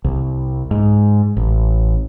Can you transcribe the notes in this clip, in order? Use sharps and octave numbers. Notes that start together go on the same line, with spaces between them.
C2
G#2
A1